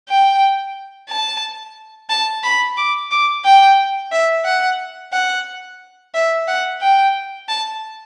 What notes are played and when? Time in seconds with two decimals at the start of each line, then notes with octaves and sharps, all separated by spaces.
0.09 G5
1.09 A5
2.10 A5
2.44 B5
2.77 D6
3.11 D6
3.45 G5
4.12 E5
4.45 F#5
5.13 F#5
6.14 E5
6.48 F#5
6.81 G5
7.48 A5